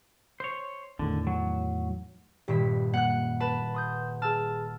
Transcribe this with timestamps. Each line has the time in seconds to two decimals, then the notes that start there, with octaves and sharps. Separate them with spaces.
0.40 C5 C#5
0.99 E2 A2 D3 D#3
1.27 F#3
2.48 D#1 G2 G4 B6
2.94 F#2 A#3 F#5 F#6
3.40 B4 A5
3.75 C6 D#6 G6
4.22 G#4 A5 E6 F6